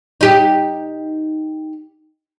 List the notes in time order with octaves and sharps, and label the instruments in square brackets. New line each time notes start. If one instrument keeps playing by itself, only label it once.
[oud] D#4 G4